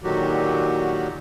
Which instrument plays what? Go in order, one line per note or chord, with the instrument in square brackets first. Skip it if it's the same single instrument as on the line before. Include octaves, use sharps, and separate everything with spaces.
[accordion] A#2 D3 D#3 F#3 F#4 G4